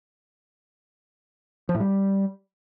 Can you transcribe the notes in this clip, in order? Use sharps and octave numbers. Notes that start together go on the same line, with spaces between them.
F3
A2
G3